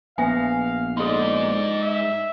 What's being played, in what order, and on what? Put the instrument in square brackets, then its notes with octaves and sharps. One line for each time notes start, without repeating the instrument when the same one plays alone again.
[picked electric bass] A#1 B3 [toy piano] E5 G#5 [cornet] F5
[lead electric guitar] G#2 D#4 [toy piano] A4 C6 [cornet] D5
[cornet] E5